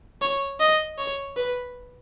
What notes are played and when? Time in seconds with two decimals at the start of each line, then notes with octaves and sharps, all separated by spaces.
0.21 C#5
0.60 D#5
0.98 C#5
1.37 B4